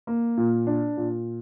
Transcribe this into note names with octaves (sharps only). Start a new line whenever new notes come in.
A#3
A#2
D4
A#2